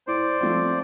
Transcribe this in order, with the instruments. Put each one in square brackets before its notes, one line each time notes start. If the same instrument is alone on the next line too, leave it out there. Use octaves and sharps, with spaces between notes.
[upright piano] A2 [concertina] C5 D5
[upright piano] F3 A3 C4 F4